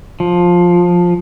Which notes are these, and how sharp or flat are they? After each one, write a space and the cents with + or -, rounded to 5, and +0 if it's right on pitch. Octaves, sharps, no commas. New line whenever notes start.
F3 +10